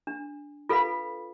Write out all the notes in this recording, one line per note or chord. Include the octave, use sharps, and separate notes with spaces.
D4
F4 A4 B4 F5 B5